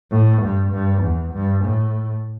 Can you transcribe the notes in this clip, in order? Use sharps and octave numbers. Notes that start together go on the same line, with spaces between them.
A2
G2
G2
E2
G2
A2